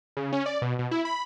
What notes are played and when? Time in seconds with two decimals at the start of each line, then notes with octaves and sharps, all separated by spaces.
0.17 C#3
0.32 C#4
0.46 D5
0.62 B2
0.79 B2
0.91 E4
1.05 B5